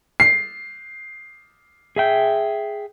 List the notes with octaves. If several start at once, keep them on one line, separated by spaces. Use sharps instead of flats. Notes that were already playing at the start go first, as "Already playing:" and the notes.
C7
G#4 E5 G5